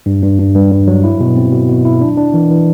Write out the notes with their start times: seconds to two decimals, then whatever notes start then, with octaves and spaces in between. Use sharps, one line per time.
0.06 G2
0.22 G2
0.38 G2
0.55 G2
0.71 G2
0.87 F#3
1.04 E4
1.20 B2
1.36 C4
1.53 B2
1.69 B2
1.85 E4
2.01 D4
2.17 D4
2.34 E3
2.51 E3